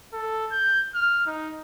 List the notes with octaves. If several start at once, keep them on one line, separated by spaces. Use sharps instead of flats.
A4
G6
F6
D#4